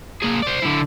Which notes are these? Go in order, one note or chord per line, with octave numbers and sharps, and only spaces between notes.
A#3 G#4
C5 D5
D3 E4